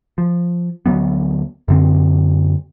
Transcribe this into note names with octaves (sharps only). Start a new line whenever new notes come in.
F3
D2 F#3 A3 B3
F#2 D3 C4